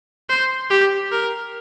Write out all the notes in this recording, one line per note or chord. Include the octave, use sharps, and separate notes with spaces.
C5
G4
A#4